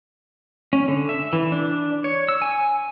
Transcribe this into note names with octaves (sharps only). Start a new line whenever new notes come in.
C#4
D3
E5
E3
D4
C#5
E6
G#5